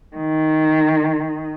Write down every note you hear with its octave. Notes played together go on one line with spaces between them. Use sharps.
D#3